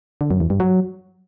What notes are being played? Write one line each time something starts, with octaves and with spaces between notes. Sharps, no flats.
D3
F#2
E2
G2
F#3